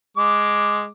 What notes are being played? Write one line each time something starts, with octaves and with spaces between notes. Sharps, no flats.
G#3 D6